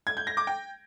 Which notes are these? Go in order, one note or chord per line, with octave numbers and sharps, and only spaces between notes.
G#6
G6
A#6
D6
G5